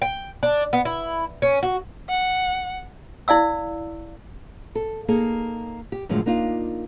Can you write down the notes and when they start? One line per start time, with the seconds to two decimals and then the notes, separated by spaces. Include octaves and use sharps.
0.02 G5
0.43 D4
0.73 B3
0.85 E4
1.42 C#4
1.63 F#4
2.09 F#5
3.28 E4 D5 F5 E6
4.75 A4
5.08 A#3 D#4 G#4 A4
5.92 G4
6.09 F#2 A2 D3 F3 G#3
6.26 A#3 D4 D#4 F4